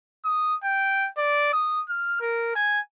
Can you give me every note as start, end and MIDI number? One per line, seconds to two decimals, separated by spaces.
0.25 0.55 87
0.63 1.09 79
1.17 1.53 74
1.53 1.81 87
1.90 2.15 89
2.20 2.51 70
2.55 2.80 80